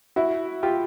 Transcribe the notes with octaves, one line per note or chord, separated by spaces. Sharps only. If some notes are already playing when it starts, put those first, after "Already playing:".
E4 F#4
F4 G4